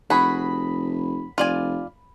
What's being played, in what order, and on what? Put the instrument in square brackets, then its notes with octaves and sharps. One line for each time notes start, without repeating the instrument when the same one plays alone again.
[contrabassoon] F1 [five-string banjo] F#4 G#4 [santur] B5
[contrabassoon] F1 [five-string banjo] F4 D5 G#5